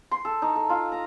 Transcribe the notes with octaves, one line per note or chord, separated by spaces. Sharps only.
C6
A4
D#4
A4
F4
A#5